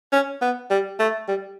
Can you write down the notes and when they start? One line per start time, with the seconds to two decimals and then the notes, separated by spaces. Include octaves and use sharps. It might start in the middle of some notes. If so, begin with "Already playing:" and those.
0.12 C#4
0.42 B3
0.70 G3
0.99 A3
1.28 G3